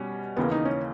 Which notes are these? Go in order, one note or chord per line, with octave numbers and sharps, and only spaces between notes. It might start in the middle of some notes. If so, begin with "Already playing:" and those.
Already playing: B2 G3 C#4
D#2 C#3 E3 A#3 B3
D#4
C#4